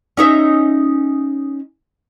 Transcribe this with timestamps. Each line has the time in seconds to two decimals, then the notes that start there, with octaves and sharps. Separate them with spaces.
0.17 C#4 D#4 E5